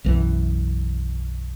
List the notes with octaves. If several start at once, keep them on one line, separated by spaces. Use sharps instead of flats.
B1 F#2 E3